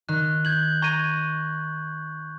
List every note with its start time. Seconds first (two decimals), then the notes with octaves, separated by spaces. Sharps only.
0.09 D#3 F#6
0.45 G6 G#6 F#7
0.82 A#5 C#6 G#6 D#7